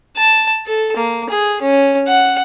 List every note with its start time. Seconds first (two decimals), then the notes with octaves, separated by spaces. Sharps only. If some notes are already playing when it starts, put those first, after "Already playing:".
0.17 A5
0.66 A4
0.97 A#3
1.30 G#4
1.62 C#4
2.08 F#5